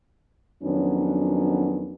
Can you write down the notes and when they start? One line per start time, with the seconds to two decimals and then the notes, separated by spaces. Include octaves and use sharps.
0.63 F2 D#3 F#3 B3 C#4 D4